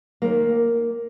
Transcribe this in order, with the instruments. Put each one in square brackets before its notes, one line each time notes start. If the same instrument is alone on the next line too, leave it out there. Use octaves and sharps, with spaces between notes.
[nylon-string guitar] D#2 D#3 A#3